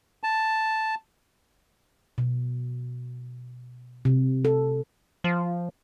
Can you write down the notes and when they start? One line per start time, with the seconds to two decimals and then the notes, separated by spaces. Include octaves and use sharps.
0.23 A5
2.18 B2
4.05 C3
4.45 A4
5.24 F3